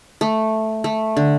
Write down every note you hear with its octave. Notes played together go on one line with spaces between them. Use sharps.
A3
A3
D3